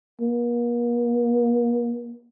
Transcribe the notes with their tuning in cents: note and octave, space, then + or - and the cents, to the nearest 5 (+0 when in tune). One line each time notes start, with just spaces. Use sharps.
A#3 +40